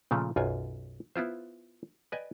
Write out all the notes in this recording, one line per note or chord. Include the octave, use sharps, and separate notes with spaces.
A#2 C#3 F3 A3
B1 F#2 F4 G#5
B3 E4 F4 C5
B4 D5 D#5 G5 G#5